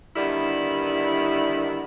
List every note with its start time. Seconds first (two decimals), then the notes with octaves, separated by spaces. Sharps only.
0.16 D3 D#3 G3 B3 E4